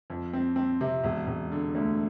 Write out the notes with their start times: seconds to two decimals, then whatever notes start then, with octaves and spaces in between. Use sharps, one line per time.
0.10 F2
0.33 C4
0.56 C4
0.81 C3
1.04 E1
1.27 E1
1.52 D3
1.75 D2